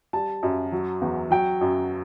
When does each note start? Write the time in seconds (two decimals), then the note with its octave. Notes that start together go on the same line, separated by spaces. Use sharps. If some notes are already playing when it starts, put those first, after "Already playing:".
0.13 G3 A5
0.43 F#2
0.72 F#3
1.01 E2
1.31 F#3 G5
1.61 F#2